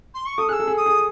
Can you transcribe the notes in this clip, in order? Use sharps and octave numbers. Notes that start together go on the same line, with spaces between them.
C6
C#6
A4 D#6
G#4 E6 F#6
A4
G#4
D#6
G#4